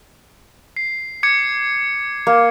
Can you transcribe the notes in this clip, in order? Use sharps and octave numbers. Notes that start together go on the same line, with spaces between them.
C7
D6 G#6 C#7
A#3